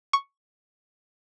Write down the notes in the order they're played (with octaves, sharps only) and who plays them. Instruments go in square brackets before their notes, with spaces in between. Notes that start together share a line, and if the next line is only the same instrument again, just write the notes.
[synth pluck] C#6